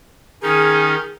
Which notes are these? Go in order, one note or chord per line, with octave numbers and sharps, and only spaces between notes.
D#3 C#4 D#4 G#4